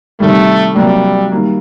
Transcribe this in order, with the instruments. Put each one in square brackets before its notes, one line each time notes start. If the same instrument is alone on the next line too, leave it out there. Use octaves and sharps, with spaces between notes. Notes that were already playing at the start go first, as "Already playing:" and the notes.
[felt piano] C3 D#3 G3 [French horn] A3
[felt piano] C3 F#3 A#3 D4 A4 [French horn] G3
[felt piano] D#3 G3 A#3